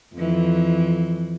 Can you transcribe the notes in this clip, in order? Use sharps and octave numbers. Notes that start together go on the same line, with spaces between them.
F2 E3